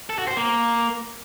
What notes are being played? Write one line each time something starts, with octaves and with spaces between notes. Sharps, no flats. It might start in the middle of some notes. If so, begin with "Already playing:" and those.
A4
F#4
C5
A#3